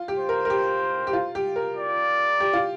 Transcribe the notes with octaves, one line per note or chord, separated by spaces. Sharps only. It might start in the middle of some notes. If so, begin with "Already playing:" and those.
Already playing: F4
G4
C5
A#4
A#4
G4
G4
F4
G4
A#4
D5
G4
F4